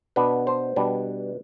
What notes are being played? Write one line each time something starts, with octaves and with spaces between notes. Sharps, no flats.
B2 B3 D4 B4
C5
B2 G3 D4 B4